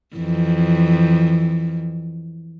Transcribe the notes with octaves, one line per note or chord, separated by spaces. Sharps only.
F2 E3